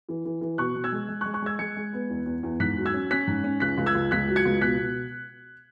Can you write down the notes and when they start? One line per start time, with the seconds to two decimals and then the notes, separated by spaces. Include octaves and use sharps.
0.09 E3
0.25 E3
0.41 E3
0.58 B2 C#6 F#6
0.75 B2
0.84 E6 G#6
0.92 G#3
1.09 G#3
1.21 C#6 F#6
1.26 G#3
1.34 C#6 F#6
1.42 G#3 E6 G#6
1.59 G#3 G#6 C#7
1.76 G#3
1.93 B3
2.10 E2
2.26 E2
2.43 E2
2.60 G#2 F#6 B6
2.77 F#3
2.86 E6 G#6
2.94 C#4
3.11 C#4 F#6 B6
3.27 G#2
3.44 C#4
3.60 C#2 F#6 B6
3.78 C#2
3.86 E6 G#6
3.95 C#2
4.11 C#2 F#6 B6
4.28 F#3
4.36 G#6 C#7
4.45 C#2
4.61 B2 F#6 B6
4.78 B2